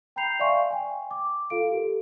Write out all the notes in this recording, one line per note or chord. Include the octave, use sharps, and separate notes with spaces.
G5 A#5 B5 G6 C7 F7
D5 E5 F5 G#5 C6 C#6
G5 G#5
D6
F4 A4 F5 D7
G4 A4 A#4